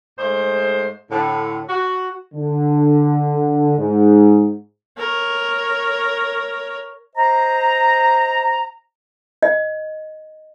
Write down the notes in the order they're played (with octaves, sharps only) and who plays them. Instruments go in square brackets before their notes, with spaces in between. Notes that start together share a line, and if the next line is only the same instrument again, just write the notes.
[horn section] G#2 G#3 A3 C5
A2 D3
F#4
[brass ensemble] D3
G#2
[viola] A#4 C#5
[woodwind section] C5 D#5 A#5
[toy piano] D#5